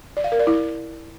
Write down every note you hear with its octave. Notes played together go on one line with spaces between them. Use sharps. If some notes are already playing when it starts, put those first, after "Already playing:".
D5
F5
A#4
D5
E4